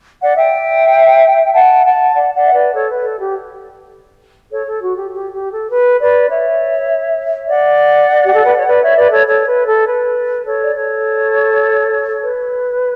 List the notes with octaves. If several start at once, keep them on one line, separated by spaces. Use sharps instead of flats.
D5 F#5
E5 G5
F#5 A5
F#5 A5
D5 F#5
D5 F#5
E5
B4 D5
A4 C#5
B4
A4
G4
A4 C#5
A4
F#4
G4
G4
G4
A4
B4
B4 D5
C#5 E5
D5 F#5
G4
A4
B4
C#5
B4 D5
C#5 E5
B4 D5
A4 C#5
A4 C#5
B4
A4
B4
A4 C#5
D5
A4 C#5
B4